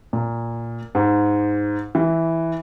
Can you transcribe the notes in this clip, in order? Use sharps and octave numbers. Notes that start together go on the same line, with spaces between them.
A#2
G#2
E3